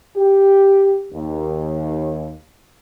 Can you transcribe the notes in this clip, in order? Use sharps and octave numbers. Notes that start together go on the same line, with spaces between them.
G4
D#2